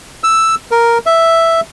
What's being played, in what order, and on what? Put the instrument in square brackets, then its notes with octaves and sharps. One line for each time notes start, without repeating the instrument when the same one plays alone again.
[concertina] E6
A#4
E5